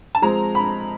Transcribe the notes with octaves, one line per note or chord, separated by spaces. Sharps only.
A5
F3 G#3 C4 A#5
B5